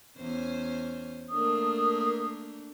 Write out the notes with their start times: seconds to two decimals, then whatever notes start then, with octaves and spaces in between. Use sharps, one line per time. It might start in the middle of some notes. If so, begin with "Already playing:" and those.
0.18 E2 C#4 C5
1.31 A3 A#3 D4 A#4 D#6